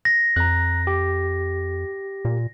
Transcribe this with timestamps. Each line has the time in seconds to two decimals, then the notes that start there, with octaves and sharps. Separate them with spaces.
0.05 A#6
0.36 F2 A#5 F#6
0.87 G4
2.25 A#2